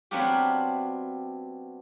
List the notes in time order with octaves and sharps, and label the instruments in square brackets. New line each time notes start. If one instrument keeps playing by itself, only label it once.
[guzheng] F#3 B3 C4 D4 F4 G4